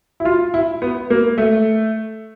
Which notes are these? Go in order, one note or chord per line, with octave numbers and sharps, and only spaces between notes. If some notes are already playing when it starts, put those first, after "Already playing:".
E4
F4
E4
B3
A#3
A3